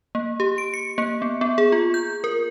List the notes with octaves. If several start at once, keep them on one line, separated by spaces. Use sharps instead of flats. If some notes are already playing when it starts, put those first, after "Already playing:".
A#3
G4
D7
C#7
A#3
B3
B3
G#4
F4
G6
A#4